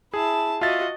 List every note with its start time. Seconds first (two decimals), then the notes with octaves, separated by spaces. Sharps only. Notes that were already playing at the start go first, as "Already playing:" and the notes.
0.14 E4 G#4 A5
0.61 F4 F#4 D#5 E5 A6